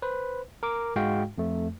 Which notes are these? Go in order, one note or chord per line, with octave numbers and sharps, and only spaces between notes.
B4 C5
A#4 D6
G#2 G#3 F#4 F5 G5
F2 A3